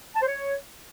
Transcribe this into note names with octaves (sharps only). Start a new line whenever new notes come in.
A5
C5
C#5